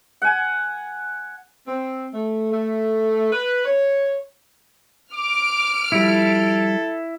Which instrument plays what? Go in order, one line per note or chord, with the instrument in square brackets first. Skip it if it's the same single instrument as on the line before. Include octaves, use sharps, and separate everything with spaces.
[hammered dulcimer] F#5 G#5
[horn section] C4
A3
A3
B4
C#5
[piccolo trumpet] D6 [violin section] F6 D7
[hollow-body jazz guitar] F3 G3 [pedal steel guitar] E4 [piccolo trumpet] A4